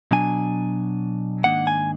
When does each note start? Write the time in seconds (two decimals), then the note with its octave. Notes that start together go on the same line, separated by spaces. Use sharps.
0.11 B2 F#3 D4 G#5
1.44 G#2 D#3 A#3 D4 F#5
1.67 G#5